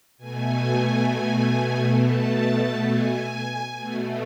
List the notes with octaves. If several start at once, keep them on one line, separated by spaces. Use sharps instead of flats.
B2 A3 G#5
A5
G#5
B2 A3